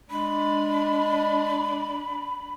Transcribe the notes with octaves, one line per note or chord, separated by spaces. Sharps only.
G#3 D4 B5